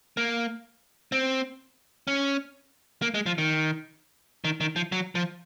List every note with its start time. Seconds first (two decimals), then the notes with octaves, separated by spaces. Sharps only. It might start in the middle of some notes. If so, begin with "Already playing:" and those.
0.17 A#3
1.12 C4
2.07 C#4
3.02 A#3
3.14 G#3
3.26 F3
3.38 D#3
4.45 D#3
4.61 D#3
4.76 F3
4.92 F#3
5.15 F3